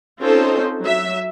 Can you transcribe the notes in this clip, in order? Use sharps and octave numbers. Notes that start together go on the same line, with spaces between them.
C4 C#4 D#4 F4 A4 C5
F#3 E5